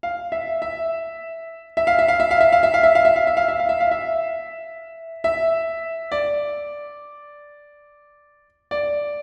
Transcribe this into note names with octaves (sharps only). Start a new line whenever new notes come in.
F5
E5
E5
E5
F5
E5
F5
E5
F5
E5
F5
E5
F5
E5
F5
E5
F5
E5
F5
E5
F5
E5
F5
E5
E5
D5
D5